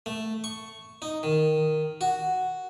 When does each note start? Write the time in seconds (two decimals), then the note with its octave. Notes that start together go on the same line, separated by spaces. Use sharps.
0.06 A3
0.44 C#6
1.02 D#4
1.23 D#3
2.01 F#4